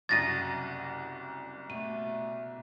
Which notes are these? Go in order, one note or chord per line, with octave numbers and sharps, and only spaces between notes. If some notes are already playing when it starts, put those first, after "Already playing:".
F#1 C2 F#2 F#4 F#5 A6 A#6 D#7
B2 A3 D#7